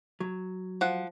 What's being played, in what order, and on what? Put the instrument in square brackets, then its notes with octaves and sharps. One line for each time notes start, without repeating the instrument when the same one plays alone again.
[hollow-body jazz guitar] F#3
[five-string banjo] F3 F#5